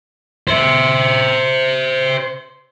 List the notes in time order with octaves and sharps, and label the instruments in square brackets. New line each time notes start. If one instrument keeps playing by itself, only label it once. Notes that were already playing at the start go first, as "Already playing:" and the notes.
[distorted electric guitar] C5 E5